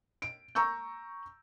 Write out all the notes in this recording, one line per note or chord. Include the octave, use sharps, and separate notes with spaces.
D7
A#5 C#6 E6 G6